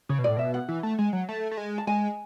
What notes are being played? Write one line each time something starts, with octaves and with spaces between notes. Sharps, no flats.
C#3 C#5
B2
A2 D5
B2 E5
F#5
E3
A3
G#3
F#3
A3
A3
G#3
A5
G#3 G#5